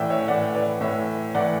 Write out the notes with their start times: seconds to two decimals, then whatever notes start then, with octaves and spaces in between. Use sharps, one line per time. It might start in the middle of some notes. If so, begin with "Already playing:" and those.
Already playing: A2 E3 D5 E5 F#5 G5
0.10 C#5 E5
0.28 A2 E3 D5 F#5
0.54 B4 D5
0.81 A2 E3 C#5 E5
1.35 A2 E3 D5 F#5